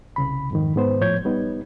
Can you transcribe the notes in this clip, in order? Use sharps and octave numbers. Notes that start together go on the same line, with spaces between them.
C2 C#3 B5
F2 G#2 D#3
G#2 B3 C5
A2 F3 C#5 G6 G#6
G3 B3 D#4